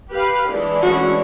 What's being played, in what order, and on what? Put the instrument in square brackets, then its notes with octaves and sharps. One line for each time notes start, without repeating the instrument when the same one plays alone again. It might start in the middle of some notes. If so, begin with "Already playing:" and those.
[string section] G4 B4 F5
E3 G#3 D4
[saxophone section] A2 C#4 F#4